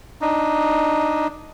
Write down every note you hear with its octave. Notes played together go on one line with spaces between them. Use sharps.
D4 D#4